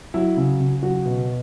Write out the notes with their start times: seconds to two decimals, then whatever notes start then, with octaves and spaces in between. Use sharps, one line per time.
0.14 F#3 E4
0.37 C#3
0.60 C#3
0.83 F#3 F#4
1.06 B2